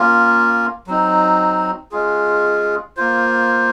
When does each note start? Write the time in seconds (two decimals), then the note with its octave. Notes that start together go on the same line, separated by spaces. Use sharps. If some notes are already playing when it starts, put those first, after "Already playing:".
Already playing: A#3 C#4 F4
0.87 F#3 C4 D#4
1.91 G#3 C#4 F4 G#4
2.97 A#3 F4 C5